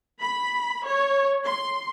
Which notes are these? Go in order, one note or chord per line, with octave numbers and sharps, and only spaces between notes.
B5
C#5
C6